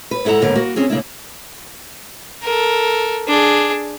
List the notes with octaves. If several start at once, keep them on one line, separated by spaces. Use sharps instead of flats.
B4
G#2 E4 A4 F#5 A#5
D#2 G#2 D3 A#3 B3
A#3 F#4
C4 C#4 G#4
C#3 A#3 D4 E4
A4 A#4
D4 G#4